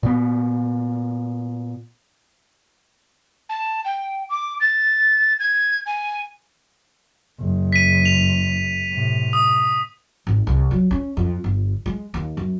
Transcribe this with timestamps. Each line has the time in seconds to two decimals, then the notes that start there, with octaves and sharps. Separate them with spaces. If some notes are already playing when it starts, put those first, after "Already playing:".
0.03 A#2 B3
3.49 A5
3.85 G5
4.30 D6
4.60 A6
5.40 G#6
5.86 G#5
7.39 F#1
7.73 B6 D#7
8.06 F7
8.90 A2 C3
9.33 D#6
10.27 G#1
10.47 C2
10.71 F#3
10.91 C#4
11.17 F2
11.44 G1
11.86 G#3
12.14 D#2
12.37 F#2